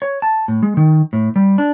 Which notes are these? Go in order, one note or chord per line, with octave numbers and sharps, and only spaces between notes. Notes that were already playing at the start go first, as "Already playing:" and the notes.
C#5
A5
A2
G#3
D#3
A2
G3
D4